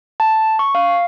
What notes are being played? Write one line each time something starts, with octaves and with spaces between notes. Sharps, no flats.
A5
C#6
F5